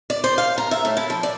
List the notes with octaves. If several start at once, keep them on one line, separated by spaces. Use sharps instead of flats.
D5
C5
F5
A#5
E5
A2
E4
F3
D5